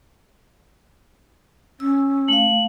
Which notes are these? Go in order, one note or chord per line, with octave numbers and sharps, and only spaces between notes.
C#4 E6
A3 F5 F#7